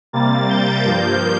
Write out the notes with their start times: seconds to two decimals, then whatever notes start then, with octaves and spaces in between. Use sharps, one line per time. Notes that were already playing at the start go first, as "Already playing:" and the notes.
0.13 C3 G3 A#3 A6
0.49 G6
0.85 G2 F3 A#3